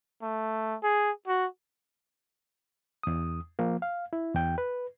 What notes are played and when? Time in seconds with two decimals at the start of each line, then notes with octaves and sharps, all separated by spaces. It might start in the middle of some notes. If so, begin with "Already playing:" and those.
0.22 A3
0.83 G#4
1.28 F#4
3.03 E2 D#6
3.59 F3 A#3
3.82 F5
4.13 E4
4.35 E2 G5
4.58 B4